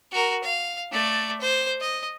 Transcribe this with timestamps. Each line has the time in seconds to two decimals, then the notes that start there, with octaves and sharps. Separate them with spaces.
0.12 F#4 A#4
0.44 F5
0.92 A3 D5
1.41 C5
1.81 D#5